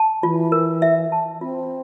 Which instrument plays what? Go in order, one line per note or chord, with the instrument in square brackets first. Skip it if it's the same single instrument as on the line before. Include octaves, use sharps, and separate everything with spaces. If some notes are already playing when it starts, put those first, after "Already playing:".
Already playing: [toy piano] A5
[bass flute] E3 [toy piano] F4
[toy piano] A#4
E5
A5
[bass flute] C4 [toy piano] F4